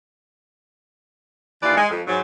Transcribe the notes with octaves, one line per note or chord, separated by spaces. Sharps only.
D#2 E3 F4 B4 D5
G#3
F2
G#2 F#3